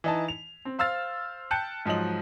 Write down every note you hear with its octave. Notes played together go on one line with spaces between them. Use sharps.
E3 D#4 A5
F7
C4
C5 F5 E6 F6 A6
G5 A5 F#6 G6 C#7
G#2 F3 F#3 D#5 F#7